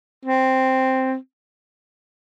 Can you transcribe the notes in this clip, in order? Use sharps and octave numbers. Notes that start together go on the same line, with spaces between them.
C4